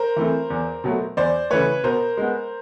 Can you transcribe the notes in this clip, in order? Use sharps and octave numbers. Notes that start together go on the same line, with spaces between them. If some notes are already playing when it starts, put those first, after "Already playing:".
Already playing: A#4 C5
E3 A3 C4
E2
B2 F#3 A3
E2 C5 D5
C#3 E3 A3 B4 C#5
B2 A#4 C5
G#3 B3